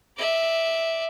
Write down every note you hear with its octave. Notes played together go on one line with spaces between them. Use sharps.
D5 E5